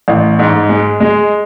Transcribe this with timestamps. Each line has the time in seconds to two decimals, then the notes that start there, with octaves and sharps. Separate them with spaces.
0.08 A1
0.39 G#2
0.69 G#3
1.00 G#3